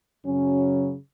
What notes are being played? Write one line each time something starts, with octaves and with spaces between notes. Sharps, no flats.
F#2 C#3 F#3 C#4